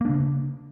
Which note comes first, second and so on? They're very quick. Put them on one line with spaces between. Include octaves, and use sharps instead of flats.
A#3 D4 C#3